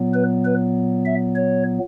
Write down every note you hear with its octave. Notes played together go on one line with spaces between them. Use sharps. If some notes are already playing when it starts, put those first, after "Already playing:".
Already playing: A#2 F#3 B3
B4
B4
E5
C#5